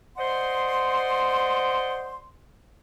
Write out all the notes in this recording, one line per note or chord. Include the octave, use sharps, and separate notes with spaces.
C5 D5 D#5 F#5 C6